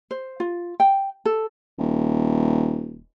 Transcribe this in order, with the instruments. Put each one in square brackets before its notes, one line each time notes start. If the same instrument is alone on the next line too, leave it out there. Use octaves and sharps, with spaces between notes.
[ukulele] C5
F4
G5
A4
[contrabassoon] D#1